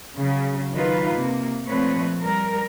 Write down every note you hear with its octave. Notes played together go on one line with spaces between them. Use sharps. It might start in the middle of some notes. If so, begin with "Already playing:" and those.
C#3 F#3
D#3 F#3 D#4 F4 B4
C3 A#3
A#2 F3 A3 C4 B4 C#5
G3 A#4